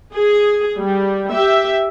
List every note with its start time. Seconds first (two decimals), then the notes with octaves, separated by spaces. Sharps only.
0.14 G#4
0.78 G3
1.31 G4 E5